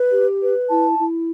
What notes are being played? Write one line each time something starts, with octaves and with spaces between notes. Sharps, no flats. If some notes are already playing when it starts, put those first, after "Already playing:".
Already playing: B4
G4
B4
E4 A5
E4